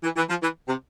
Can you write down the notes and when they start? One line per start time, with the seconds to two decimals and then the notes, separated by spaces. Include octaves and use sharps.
0.04 E3
0.16 E3
0.30 F3
0.43 E3
0.68 C3